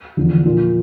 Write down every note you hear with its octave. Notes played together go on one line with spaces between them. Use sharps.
E2 D3 F3
A#2 F3 A#3 F4